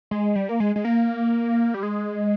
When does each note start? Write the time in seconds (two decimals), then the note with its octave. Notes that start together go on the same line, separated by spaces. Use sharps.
0.11 G#3
0.35 G3
0.49 A#3
0.60 G#3
0.76 G#3
0.85 A#3
1.74 G3
1.83 G#3